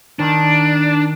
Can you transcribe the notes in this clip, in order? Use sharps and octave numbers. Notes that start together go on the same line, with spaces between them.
D#3 D4